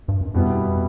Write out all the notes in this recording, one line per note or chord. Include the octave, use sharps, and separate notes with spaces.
G2
F#2
F2 B2 G3 B3 E4